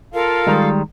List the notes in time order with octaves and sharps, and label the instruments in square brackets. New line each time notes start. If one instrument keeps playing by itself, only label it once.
[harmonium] F4 A4 F5 [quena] A#4
[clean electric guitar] D#3 G3 G#3